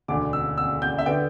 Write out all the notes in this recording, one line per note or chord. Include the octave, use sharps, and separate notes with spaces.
E1 D2 D3 D6
E6
E6
G6
E5
D3 B3 G5